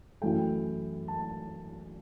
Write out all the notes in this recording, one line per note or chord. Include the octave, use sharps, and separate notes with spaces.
F#2 E3 A3 G5
A5